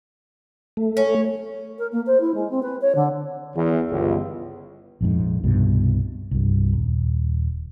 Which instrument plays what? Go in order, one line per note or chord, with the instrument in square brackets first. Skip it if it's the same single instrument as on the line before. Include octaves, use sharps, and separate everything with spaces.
[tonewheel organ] A3
[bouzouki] C#4
[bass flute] A#4
A#3
C5
E4
G#3
C4
B4
C#5
D3
[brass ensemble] E2
G1 C#2
[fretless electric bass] A#1 F2 G#2
C2 G2 B2
C2 G2
D#1